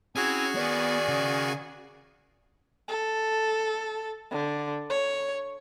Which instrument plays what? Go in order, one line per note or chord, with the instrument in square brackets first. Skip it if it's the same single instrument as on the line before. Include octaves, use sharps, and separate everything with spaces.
[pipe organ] C4 E4 C#5 [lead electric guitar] C#4 [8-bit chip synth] F#4 G#4 G#5
[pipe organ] D#3 [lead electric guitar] B3 [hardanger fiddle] D5
[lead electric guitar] C#3
[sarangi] A4
D3
C#5